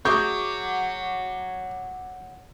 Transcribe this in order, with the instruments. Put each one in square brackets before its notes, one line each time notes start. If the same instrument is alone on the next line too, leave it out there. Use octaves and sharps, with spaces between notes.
[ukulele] F#4 G#4 E5 [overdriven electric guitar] C#5 F#5 [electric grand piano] C#6 D6 [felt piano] G6